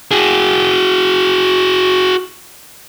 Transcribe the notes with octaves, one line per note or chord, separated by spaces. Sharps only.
F#4 G#4